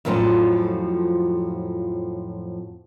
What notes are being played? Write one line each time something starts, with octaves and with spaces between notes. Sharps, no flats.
F2 A2 F3 F#3 C#4